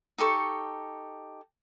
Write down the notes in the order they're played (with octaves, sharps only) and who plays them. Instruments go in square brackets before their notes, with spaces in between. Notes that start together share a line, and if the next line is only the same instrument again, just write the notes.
[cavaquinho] D#4 G4 A4 C#6